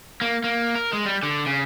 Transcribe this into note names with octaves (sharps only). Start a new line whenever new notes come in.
A#3
A#3
A#4
G#3
G3
D3
C#3